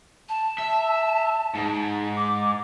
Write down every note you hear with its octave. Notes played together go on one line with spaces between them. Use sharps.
A5
E5
G#2
D6